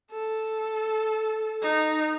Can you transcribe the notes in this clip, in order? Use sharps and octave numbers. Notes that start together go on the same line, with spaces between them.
A4
D#4